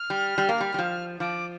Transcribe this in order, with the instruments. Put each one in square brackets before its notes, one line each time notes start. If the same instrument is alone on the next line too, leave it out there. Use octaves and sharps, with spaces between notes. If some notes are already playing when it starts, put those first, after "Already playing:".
Already playing: [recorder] F6
[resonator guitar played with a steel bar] G3
G3
A#3
G3
G3
F3
[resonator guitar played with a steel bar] F3 [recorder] D6